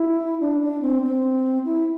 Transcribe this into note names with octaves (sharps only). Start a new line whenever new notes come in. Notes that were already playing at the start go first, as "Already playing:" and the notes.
Already playing: E4
D4
D4
C4
C4
E4